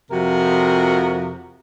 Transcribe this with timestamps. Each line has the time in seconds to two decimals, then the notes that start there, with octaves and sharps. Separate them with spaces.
0.11 F2 C3 F3 F#4 A#4